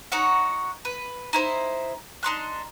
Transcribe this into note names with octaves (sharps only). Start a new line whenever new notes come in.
D#4 F#4 C#5 F#5
B4
D#4 E4 C5
D4 D#4 C6 F#6